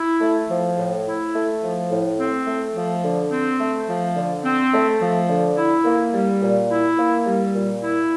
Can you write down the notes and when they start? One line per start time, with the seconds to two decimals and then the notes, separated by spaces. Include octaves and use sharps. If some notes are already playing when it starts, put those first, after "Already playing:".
Already playing: E4
0.21 A3
0.49 F3
0.78 A2
1.06 E4
1.35 A3
1.63 F3
1.90 A2
2.18 C4
2.47 A3
2.74 F3
3.04 D3
3.31 C4
3.59 A3
3.88 F3
4.16 D3
4.44 C4
4.73 A3
5.01 F3
5.29 D3
5.57 E4
5.85 A#3
6.13 G3
6.42 A#2
6.70 E4
6.98 A#3
7.26 G3
7.54 A#2
7.82 E4